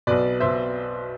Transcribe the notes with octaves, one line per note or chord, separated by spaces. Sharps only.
B1 B2 B4 D5
B2 C5 E5